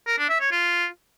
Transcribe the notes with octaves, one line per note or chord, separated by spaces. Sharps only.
A#4
D4
E5
C#5
F4